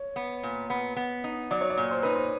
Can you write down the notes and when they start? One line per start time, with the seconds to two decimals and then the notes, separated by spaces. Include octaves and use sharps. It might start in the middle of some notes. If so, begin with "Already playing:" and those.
Already playing: C#5
0.16 B3
0.43 A#2
0.70 B3
0.96 B3
1.24 D#4
1.51 F#3 D5
1.61 C#5
1.70 D5
1.77 A#2
1.91 C5
2.03 D#4 B4
2.15 C5